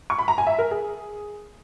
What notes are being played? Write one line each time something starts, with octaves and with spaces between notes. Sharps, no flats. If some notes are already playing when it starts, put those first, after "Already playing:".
C#6
B5
A#5
G#5
E5
A#4
G#4